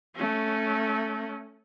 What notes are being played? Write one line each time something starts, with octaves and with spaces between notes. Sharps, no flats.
A3 C#4